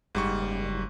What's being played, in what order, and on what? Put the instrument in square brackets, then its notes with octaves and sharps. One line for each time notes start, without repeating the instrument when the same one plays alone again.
[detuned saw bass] F#1 [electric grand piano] G#2 G3 C#6